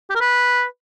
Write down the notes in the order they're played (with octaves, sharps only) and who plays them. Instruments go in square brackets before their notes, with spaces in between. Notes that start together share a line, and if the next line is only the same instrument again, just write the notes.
[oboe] G4
A#4
B4